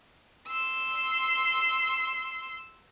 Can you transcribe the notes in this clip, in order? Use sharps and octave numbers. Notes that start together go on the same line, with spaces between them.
C6 E6